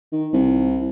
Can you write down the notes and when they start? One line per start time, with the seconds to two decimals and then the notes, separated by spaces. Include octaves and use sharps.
0.12 D#3
0.33 C2